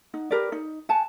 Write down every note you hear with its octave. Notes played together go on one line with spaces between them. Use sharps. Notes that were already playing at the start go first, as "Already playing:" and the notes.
D#4 F#5
G4 A#4 B4 D5
D#4
F#5 G#5 A5